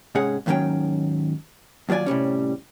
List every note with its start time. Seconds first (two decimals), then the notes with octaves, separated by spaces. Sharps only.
0.15 G#2 C3 G#3 C#4 G#4 F#5
0.46 D#2 G#2 D#3 F#3 C#4 G5
1.89 D#2 F#3 F4 D5 G#5
2.06 A2 C3 G3 C#4